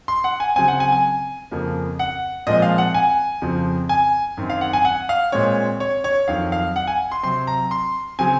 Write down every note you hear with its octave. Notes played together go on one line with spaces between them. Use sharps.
C6
F#5
G#5
C#3 F#3 C4 G#5
F#5
G#5
G#5
F2 C#3 F3 A#3
F#5
A#2 F3 G#3 C4 D#5
F5
F#5
G#5
F2 C#3 F3 C4
G#5
F#2 D#3 F#3 C4
F5
F#5
G#5
F#5
F5
A#2 G#3 C4 C#5
C#5
C#5
F2 D#3 F#3 F5
F5
F#5
G#5
C6
C3 F#3 C4 C6
A#5
C6
C#3 F#3 C4 G#5